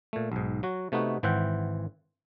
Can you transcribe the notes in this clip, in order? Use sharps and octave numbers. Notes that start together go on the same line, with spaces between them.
A#2 A3
B1 G#2
F#3 F#4
C3 A3 B3 D#4 F#4
G#1 E3 C5 E5 F#5 G5